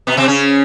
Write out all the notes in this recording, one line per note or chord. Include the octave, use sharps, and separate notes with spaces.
B2 B3
C3 C4
C#3 C#4